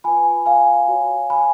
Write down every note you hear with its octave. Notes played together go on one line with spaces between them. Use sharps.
F4 B4 G#5 B5
F5 G#5
F#4 C#5
G#5 B5